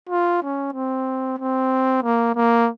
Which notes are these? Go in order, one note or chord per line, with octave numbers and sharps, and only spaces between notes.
F4
C#4
C4
C4
A#3
A#3